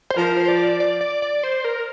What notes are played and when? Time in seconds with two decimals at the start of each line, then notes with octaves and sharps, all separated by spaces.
0.10 C5
0.17 F3 A#4
0.37 C5
0.48 D5
0.80 D5
1.01 D5
1.22 D5
1.43 C5
1.65 A#4